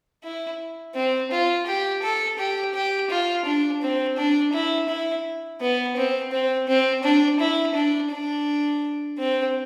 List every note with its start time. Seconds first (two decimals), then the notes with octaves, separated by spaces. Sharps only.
0.24 E4
0.95 C4
1.31 F4
1.66 G4
2.03 A4
2.39 G4
2.74 G4
3.10 F4
3.45 D4
3.82 C4
4.17 D4
4.53 E4
4.88 E4
5.61 B3
5.96 C4
6.32 C4
6.68 C4
7.03 D4
7.40 E4
7.75 D4
8.11 D4
9.18 C4